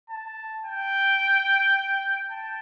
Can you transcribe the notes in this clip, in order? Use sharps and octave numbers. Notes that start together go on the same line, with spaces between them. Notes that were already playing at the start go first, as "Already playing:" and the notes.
A5
G5
A5